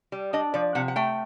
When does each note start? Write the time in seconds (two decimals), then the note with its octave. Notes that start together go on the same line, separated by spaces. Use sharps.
0.12 G3
0.33 D4 D#5
0.54 F3 D5
0.75 C3 F#5
0.88 F#5
0.96 A3 G5